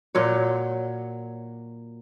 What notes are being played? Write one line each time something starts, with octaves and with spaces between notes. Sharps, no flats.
A#2 F#3 C#5